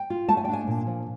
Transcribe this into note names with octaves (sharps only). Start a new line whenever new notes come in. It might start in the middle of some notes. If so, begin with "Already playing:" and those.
Already playing: G5
F4
A3 A5
G#5
G5
D4 G#5
A#2
F3